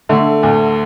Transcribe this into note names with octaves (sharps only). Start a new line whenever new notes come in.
D3 A3
D2